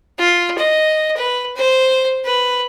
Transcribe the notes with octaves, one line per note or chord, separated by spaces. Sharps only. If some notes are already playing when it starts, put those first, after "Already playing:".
F4
D#5
B4
C5
B4